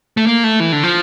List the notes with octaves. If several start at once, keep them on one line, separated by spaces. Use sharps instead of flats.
A3
A#3
A3
E3
D3
F3